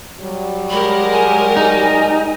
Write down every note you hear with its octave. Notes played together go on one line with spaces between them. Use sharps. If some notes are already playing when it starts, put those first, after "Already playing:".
F#3 G3
G#3 G4 A#4 B5
G#5
D#4